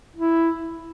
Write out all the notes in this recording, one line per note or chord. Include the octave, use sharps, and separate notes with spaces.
E4